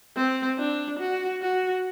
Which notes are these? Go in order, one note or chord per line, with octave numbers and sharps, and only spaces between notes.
C4
D4
F#4
F#4